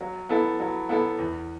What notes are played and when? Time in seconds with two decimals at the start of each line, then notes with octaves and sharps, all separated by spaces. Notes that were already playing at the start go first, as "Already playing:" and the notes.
0.01 F#3
0.29 B3 E4 A4
0.60 F#3
0.89 B3 E4 A4
1.19 E2